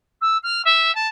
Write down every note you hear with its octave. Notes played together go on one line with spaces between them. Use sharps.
E6
F6
E5
A5